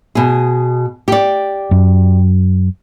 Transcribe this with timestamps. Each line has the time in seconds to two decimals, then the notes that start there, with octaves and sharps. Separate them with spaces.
0.15 B2 G#4
1.08 G4 D5
1.71 F#2